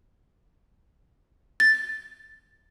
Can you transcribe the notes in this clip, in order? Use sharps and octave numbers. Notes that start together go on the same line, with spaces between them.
A6